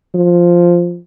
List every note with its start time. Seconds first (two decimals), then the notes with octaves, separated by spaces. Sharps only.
0.15 F3